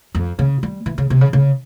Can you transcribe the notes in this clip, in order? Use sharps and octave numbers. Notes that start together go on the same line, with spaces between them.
F2
C#3
G3
E3
C#3
C3
C#3
C#3